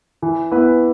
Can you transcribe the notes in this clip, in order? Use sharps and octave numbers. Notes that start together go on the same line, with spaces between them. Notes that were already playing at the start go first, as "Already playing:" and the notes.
E3
B3 E4 B4